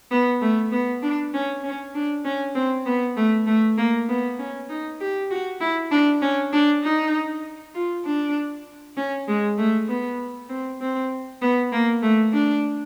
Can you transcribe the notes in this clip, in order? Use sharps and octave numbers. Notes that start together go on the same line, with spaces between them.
B3
A3
B3
D4
C#4
C#4
D4
C#4
C4
B3
A3
A3
A#3
B3
C#4
D#4
G4
F#4
E4
D4
C#4
D4
D#4
F4
D4
C#4
G#3
A3
B3
C4
C4
B3
A#3
A3
D4